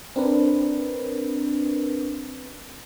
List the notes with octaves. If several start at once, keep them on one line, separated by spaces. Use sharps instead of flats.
C4 D4 A#4 B4